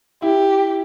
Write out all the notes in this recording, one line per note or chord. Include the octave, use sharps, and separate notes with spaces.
E4 G4